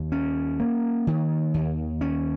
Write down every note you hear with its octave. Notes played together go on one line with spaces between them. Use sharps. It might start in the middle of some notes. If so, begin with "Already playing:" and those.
Already playing: D#2
C#4
A#3
D#3
D#2
C#4